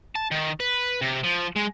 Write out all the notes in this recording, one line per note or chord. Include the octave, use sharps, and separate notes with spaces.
A5
D#3
B4
C3
F3
G#3